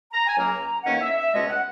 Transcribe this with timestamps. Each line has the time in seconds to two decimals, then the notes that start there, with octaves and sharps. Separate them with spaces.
0.13 A#5
0.27 G#5
0.36 C#2 C#3 F#3 A#3 A#5
0.84 E2 D#3 A#3 C#4 F#5
1.01 E5
1.17 E5
1.33 C#2 B2 G#3 C#4 D#5
1.49 F#5